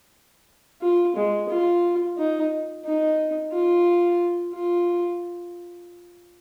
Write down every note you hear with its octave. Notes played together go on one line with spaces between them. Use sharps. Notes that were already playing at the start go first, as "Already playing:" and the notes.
F4
G#3
F4
D#4
D#4
F4
F4